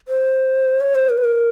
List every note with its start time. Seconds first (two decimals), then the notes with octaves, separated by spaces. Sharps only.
0.08 C5
0.81 C#5
0.95 C5
1.10 A#4
1.18 B4
1.24 A#4